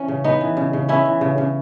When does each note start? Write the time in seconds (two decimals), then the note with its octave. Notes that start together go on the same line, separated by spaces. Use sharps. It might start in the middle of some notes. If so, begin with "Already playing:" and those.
Already playing: E3 C#4
0.08 C#3
0.24 B3 D#4
0.41 E3
0.57 C#3
0.73 C#3
0.88 B3 C#4 E4
1.05 E3
1.21 C#3
1.38 C#3